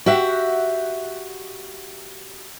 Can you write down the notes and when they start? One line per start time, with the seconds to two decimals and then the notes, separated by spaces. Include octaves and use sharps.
0.06 F#4 G4 E5 F#5